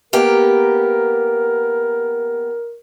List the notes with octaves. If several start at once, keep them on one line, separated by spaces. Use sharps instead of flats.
A#3 B3 G4 A#4